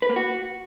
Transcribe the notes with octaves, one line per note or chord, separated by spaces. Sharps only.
B4
A#3
F#4